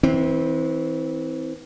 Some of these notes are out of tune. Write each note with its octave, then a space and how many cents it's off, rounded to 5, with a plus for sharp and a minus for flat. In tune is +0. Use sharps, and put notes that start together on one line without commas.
E3 -30 C4 +0